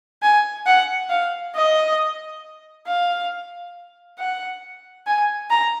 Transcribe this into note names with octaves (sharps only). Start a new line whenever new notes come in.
G#5
F#5
F5
D#5
F5
F#5
G#5
A#5